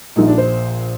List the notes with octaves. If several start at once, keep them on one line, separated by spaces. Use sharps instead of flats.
A#1 A#2 D#4
D4
C5